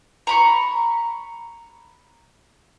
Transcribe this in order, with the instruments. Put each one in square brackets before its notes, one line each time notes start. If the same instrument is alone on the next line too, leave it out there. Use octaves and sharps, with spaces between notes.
[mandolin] A#5 B5 C#6